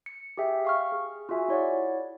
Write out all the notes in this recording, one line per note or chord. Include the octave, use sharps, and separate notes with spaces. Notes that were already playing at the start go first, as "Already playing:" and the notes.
C#7
G4 G#4 E5 G5
F5 C#6 F6
G#4
F4 F#4 G#4 E5 G#5
E4 C#5 D5 F#5